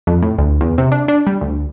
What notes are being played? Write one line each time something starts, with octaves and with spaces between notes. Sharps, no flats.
F2
A2
D2
E2
C3
D4
D4
G3
D2